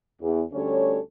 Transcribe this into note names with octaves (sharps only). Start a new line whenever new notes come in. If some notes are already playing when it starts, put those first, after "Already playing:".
E2
D2 D3 G3 C#4 A4 C#5